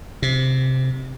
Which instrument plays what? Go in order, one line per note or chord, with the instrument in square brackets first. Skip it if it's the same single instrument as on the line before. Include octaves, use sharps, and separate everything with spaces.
[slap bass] C3